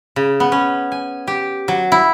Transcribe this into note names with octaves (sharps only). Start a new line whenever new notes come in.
C#3
B3
C#4
G#5
G4
F#3
E4